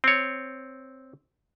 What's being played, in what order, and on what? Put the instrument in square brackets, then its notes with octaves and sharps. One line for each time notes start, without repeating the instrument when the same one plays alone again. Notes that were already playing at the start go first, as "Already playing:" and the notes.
[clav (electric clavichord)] C4 C#5